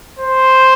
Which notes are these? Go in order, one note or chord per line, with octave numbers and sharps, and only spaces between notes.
C5